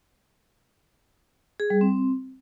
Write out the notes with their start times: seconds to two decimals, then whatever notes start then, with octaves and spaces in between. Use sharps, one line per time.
1.60 G#4
1.70 G3
1.81 C4